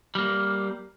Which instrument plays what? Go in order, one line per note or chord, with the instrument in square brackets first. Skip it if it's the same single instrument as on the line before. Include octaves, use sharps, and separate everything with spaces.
[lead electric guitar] G3 A#3